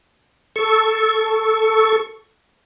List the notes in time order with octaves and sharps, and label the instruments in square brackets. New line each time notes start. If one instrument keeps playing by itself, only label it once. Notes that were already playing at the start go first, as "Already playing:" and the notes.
[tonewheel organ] A4 C#6